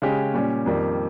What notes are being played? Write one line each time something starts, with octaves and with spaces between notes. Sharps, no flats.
C#3 G#3 C#4 G4
A#2 G3 C#4
F2 D#3 G3 A#3